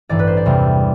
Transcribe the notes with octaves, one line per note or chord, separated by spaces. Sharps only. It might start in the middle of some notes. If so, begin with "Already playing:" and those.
A1 G2 E3 D5
B4
C5
D5
E2 C3 G3 C4